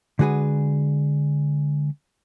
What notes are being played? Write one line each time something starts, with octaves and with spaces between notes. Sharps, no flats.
D3 G#3 F#4 G#4 B4